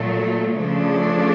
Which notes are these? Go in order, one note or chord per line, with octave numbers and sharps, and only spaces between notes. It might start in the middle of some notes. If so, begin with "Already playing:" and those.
Already playing: A#2 F#3 A3
C#3 F3 A3 D4